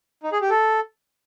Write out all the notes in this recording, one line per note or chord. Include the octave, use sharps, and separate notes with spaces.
D#4
G#4
G4
A4